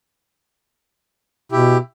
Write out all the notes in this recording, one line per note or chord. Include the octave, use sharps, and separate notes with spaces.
B2 E4 G4